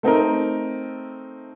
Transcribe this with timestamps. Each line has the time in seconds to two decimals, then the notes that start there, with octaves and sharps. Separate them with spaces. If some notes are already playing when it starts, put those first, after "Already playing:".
0.03 A3 C4 D#4 A#4